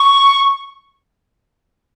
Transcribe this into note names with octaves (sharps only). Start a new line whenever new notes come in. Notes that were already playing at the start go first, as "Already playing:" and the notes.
Already playing: C#6